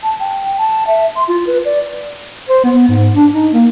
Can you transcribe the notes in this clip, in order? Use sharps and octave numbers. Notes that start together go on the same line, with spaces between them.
A5
G5
A5
E5
C6
F4
B4
D5
C5
B3
G#2
D4
D#4
A#3